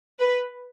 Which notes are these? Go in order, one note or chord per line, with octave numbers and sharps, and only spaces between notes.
B4